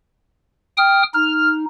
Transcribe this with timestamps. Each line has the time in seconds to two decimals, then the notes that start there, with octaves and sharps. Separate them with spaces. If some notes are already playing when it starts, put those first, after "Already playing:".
0.78 G5 D#6 F6
1.14 D#4 F6